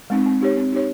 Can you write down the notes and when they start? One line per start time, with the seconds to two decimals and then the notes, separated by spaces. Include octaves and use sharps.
0.10 G#3 C4 D#4
0.26 C4
0.41 D#4 G4 C#5
0.57 C4
0.72 D#4 G4 C#5